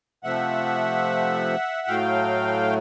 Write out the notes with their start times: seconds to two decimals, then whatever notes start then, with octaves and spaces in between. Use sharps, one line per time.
0.23 C3 F3 A3 E5 F#5
1.87 A2 F#3 A3 F5 G5